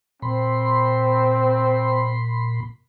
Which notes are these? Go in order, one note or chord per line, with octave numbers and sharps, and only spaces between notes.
A#2 C4 B5 C6